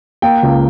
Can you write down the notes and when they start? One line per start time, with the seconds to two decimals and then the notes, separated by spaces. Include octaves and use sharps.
0.22 A#3 G5
0.43 C#2